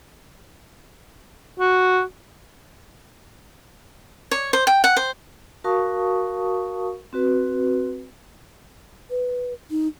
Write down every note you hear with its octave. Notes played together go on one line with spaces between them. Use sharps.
F#4
C#5
C5
G5
F#5
C5
F#4 A#4 F5 A5 C#6 D#6
C4 F#4 B4
B4
D#4